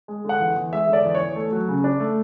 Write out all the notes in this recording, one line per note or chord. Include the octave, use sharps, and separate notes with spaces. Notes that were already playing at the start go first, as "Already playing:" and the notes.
G#3
D3
F#5
E2
E2
G#3 E5
D3
D5
E2
C#5
E2
A3
F#3
C#3
D4
A3